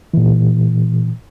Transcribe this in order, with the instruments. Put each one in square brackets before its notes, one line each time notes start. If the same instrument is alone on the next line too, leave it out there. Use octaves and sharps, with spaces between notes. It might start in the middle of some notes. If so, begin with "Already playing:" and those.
[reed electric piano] A#2 E3